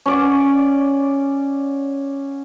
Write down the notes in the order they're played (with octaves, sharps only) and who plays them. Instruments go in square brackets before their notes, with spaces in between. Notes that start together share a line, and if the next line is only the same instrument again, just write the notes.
[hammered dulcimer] C#4 D5 F#5